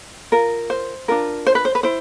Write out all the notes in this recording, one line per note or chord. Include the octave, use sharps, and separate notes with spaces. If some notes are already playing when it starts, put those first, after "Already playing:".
F4 A#4
C5
D4 F4 A#4
C5
B4
C5
B4
E4 C5